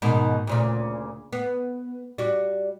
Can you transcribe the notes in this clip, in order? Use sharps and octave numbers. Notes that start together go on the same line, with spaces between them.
G#2 B2 D#3
D2 A#2 C#3
B3
G3 F#4